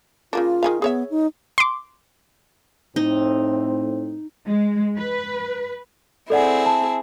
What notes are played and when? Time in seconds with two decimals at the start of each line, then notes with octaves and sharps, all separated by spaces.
0.33 C#3 A#3 D4 F4
0.63 D#3 G#4 F5
0.82 B3 G#4 C#5 E5
1.10 D#4
1.58 C6 D6
2.96 A2 C4 D#4
4.45 G#3
4.97 B4
6.30 C4 E4 G#4 A4 D5 F#5
6.66 A5